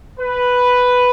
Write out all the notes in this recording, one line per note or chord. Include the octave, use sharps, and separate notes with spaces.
B4